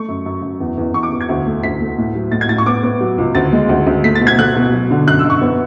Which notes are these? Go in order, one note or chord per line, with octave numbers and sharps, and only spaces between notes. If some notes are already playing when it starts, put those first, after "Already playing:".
Already playing: A3 C#6
F#2
F#2
F#2
E2
E2
E2 C#6
D6
E2
G#6
D2
A3
D2 B6
A3
A2
F#3
A2 A6
G#6
A2 A6
C#6
B3 D6
B3
F#3
C#2
D2 A6
G#3
D2
D2
A3 B6
A6
B2
G#6
A3 F#6
B2
F#3
D3
F#2 F#6
E6
F#2 C#6
B3